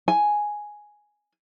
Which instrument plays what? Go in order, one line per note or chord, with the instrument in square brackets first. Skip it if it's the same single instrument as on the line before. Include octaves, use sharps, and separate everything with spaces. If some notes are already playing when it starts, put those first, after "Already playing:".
[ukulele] G#5